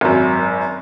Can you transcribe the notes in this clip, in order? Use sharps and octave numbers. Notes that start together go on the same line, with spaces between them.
G#1 F#2